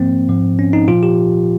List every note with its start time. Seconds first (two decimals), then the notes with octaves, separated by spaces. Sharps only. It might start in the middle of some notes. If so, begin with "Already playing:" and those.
Already playing: G#2 F3 A#3 C4
0.29 G#2 F3
0.59 C#4
0.73 D#4
0.88 A#2 F3 F4
1.03 G4